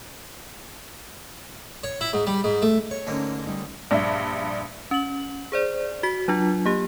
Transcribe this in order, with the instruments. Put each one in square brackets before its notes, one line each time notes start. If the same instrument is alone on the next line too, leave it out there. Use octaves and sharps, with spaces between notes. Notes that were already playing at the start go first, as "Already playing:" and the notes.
[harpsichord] C#5
E4
G#2
G3
G#2
A3
[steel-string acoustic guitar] C#5 [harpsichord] C#6
[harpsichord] G#2 D3 A#3 [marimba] A3 C#4
[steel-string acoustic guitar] G3 D#4 D5
[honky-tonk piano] A#1 G2 E5
[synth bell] C#4 F#7
G#4 C5 D5
F#4 B6
F#3 D4 F4
A#3 G4